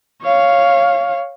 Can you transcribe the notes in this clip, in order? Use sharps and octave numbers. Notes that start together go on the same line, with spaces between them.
C#5 F5